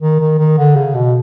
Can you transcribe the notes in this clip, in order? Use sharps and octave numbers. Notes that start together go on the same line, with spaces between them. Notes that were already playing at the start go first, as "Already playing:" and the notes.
D#3
D#3
D#3
D3
C#3
B2